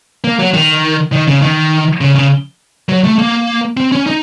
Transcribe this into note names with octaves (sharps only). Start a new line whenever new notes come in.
A#3
F#3
D#3
D#3
C#3
D#3
C#3
C#3
F#3
A3
A#3
C4
C#4
D#4